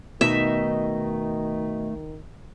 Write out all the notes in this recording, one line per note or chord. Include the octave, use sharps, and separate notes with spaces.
B2 D#3 A3 D#4 D#5 E5